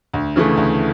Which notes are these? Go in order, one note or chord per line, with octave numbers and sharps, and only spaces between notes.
D2
C#3 E3 A3
D2